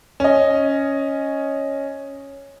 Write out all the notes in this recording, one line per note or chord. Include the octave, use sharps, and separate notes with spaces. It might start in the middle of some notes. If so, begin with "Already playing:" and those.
C#4 D#5